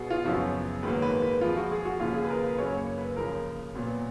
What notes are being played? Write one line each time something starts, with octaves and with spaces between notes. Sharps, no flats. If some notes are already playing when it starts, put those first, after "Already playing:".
Already playing: B2 F#3 B3 F#4 G#4
F4
F#2 C#3 F3 B3 F#4
G#2 D#3 F#3 A#3 B4
B4
B4
F2 F3 G#3 F4
F#4
G#4
F#4
D#2 C#3 F3 F4
G#4
B4
A#4
B4
F#2 C#3 F#3 A#3 C#5
C#5
B4
D#2 C#3 F3 A#4
A#2 F#3 B3